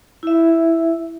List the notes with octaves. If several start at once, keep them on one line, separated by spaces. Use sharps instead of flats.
E4 E5